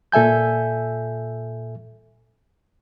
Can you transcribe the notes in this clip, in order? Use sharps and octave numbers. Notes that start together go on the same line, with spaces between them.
A#2 A4 E5 G#5 G6